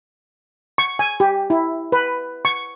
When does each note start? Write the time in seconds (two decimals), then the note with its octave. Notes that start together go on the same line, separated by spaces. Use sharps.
0.78 C#6
0.99 G#5
1.20 G4
1.50 E4
1.92 B4
2.45 C#6